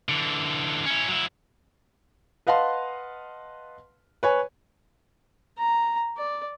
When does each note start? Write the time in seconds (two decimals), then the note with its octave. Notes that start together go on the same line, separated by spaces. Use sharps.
0.09 D3 E3
0.86 C#4 E4
1.08 F#3 E4
2.47 B4 D#5 F5 F#5 A5 C6
4.23 B4 C#5 G#5
5.58 A#5
6.17 D5